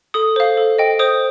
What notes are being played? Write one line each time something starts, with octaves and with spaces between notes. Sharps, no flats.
A4 D#6
C5 F5
A4
D#5 G5
C5 D#6